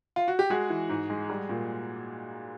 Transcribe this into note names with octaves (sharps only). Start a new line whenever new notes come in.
F4
F#4
G4
G#3 F#4 G#4
E3
G#2
G#3
G3
A#2